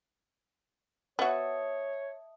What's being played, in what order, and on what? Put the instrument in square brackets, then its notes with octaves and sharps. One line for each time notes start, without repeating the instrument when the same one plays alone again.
[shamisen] B3 F#4 [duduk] C#5 [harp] D#5 E5 A5